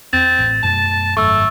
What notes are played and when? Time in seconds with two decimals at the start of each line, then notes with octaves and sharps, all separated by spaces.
0.13 E2 C4 A6
0.39 A1
0.63 F#2 B2 A3 A5
1.17 G#1 F#2 A3 C#6 E6